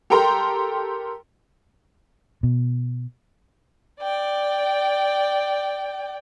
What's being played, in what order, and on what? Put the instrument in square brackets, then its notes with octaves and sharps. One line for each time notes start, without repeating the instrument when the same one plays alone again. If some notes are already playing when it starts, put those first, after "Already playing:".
[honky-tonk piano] G4 A4 A#4 G5 A#5 C6
[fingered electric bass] B2
[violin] D5 G5